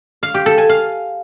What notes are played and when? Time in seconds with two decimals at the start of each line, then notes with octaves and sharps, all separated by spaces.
0.23 F5
0.34 G4
0.46 A4
0.58 G#5
0.69 F5